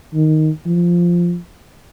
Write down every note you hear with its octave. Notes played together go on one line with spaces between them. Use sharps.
D#3
F3